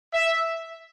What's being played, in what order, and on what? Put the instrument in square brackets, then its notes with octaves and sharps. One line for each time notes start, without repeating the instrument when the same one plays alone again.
[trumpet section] E5